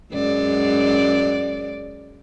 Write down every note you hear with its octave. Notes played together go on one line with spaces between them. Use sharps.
F#2 G#3 D5